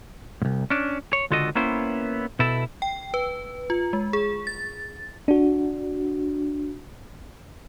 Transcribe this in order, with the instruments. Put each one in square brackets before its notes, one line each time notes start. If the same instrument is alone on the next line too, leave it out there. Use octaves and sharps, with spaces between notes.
[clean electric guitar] C2 G#2
C#4 D4
C#5
C#2 D3 F4 F#4 A4 D#5
A#3 B3 C#4 E4 C5
B2 E4 A4
[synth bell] G5
B4
F4
G#3
G#4
A6
[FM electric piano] D4 F#4